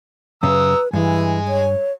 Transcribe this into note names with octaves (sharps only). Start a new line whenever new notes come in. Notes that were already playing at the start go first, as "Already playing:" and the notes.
F#2 C#3 B4 A#5 D#6 E6
G2 E3 G#3 G#5
C#5